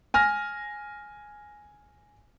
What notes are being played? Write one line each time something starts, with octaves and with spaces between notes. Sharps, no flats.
G#5 F6 A#6